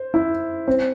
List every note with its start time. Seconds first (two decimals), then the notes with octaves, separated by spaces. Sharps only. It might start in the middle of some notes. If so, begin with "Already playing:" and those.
Already playing: C5
0.14 E4
0.68 C4